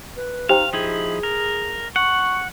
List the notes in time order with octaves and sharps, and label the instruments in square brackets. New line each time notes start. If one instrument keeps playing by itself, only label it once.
[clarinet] B4
[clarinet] D#4 [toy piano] G4 C5 G5 [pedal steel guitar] F5
[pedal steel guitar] F3 D#4 E4 [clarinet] G#4
[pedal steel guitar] A#4
[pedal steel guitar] F#5 [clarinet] C#6